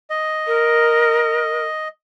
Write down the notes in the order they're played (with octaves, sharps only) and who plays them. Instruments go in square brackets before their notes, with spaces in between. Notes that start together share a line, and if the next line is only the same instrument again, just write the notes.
[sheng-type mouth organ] D#5
[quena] A#4